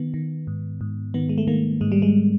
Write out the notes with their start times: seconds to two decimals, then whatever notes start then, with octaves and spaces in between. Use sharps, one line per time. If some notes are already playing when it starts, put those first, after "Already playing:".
Already playing: D#3 B3
0.14 D#3
0.47 G#2
0.81 G#2
1.14 D#3 B3
1.29 G#3
1.38 A3
1.47 D#3 A#3
1.81 G#2 G#3
1.92 G3
2.02 G#3